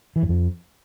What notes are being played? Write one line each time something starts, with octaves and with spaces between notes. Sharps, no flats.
E3
F#2
F2